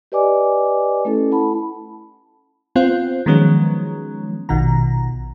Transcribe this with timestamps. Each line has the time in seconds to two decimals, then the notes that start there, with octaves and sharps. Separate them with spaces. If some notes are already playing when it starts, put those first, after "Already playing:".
0.12 G4 B4 D5 D#5 G#5 D6
1.05 A3 C#4 E4 A4
1.32 E4 F#5 A5 B5
2.75 B3 C4 F4 C5
3.26 D#3 F3 F#3 G#3 B3 C#4
4.49 A#1 B2 D#3 A#5